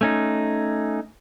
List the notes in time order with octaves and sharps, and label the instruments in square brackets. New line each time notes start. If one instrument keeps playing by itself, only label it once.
[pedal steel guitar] A3 C#4 D#4